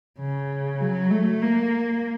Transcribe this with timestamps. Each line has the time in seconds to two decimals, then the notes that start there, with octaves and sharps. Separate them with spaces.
0.19 C#3
0.80 F#3
1.11 A3
1.41 A#3